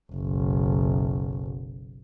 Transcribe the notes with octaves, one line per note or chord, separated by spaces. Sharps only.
F#1 B1